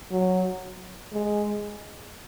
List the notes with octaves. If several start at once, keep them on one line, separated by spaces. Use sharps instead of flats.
F#3
G#3